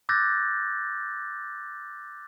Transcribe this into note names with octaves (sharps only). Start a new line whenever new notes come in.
D6 E6 F#6 G6 A6 A#6